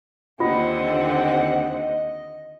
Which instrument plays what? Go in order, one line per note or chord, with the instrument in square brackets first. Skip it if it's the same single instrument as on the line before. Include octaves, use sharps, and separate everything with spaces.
[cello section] D#2 D3 [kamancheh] C4 F#5 [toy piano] F4 [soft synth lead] D#5